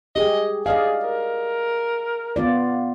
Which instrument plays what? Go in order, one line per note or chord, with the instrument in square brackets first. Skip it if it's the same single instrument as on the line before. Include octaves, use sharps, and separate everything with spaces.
[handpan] G4 G#4 [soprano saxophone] D#5
[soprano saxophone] G#4 [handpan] D5 D#5 F5
[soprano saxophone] A#4
[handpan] B3 F4 D5